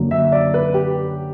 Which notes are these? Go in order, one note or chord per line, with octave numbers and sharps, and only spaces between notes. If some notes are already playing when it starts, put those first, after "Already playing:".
Already playing: F#2 D3 F#3 A#3
E5
D5
B4
G4